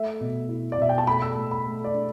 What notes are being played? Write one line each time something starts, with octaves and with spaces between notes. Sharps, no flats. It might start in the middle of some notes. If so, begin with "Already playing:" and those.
Already playing: A3 E5
B2
E4
D5
B2 E5
G5
A5
A3 B5
E6
A2
B5
A3
D5
D4